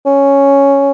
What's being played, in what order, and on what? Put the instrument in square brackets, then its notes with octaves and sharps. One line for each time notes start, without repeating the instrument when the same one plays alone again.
[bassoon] C#4